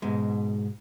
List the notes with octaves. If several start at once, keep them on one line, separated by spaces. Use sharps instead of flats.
G#2 B2 G#3